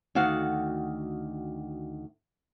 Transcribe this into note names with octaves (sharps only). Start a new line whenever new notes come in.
D2 D#3 F#4 F5 F#5